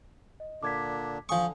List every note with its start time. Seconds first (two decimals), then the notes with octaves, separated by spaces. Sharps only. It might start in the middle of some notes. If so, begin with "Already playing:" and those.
0.40 D#5
0.63 A#2 D3 D4 D6 G#6 B6
1.29 D3 F3 F5 G#5 C#6 D#6